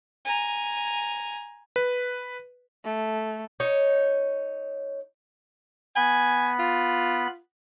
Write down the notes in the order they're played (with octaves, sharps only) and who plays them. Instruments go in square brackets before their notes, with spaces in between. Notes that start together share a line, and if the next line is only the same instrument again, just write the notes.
[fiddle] G#5 A#5
[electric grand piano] B4
[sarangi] A3
[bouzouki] D#4 C#5
[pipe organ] B3 B5 [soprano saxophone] G#5
[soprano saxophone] F4